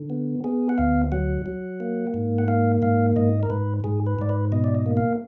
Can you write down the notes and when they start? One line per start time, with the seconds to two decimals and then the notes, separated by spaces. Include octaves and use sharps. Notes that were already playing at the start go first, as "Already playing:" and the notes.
Already playing: D3
0.10 B3
0.44 B3 G#4
0.69 F#5
0.78 D2 F5
1.12 F#3 F#5
1.46 F#3
1.80 A#3
2.14 G#2
2.38 F#5
2.48 A#3 F5
2.82 G#2 F5
3.16 G#2 D#5
3.43 A#4
3.50 G#2 B4
3.84 G#2 G#4
4.07 B4
4.19 G#2 D5
4.29 B4
4.52 B2 D#5
4.64 D5
4.75 D#5
4.86 A#3
4.97 F5